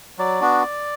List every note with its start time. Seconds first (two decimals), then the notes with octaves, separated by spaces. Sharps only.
0.18 F#3 D5
0.41 B3 D4 F#4